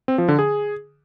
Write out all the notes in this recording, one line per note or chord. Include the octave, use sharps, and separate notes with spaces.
C4
F3
D3
G#4